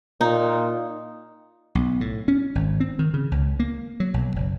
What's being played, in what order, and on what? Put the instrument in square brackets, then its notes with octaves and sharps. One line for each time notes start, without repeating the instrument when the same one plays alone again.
[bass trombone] A#2 [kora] D#4
[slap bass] B1
A2
C#4
G#1
C4
D#3
C#3
C#2
A#3
F#3
B1
F#1